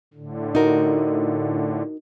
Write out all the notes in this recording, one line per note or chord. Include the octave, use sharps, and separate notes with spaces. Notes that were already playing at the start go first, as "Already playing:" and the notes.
A2 D3
D#4 F#4 A#4